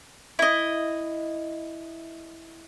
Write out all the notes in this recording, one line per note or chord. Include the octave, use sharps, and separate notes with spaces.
E4 D#5